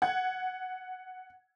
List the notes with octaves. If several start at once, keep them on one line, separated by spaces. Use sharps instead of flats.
F#5 G#6